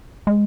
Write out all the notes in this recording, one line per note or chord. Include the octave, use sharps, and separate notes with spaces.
G#3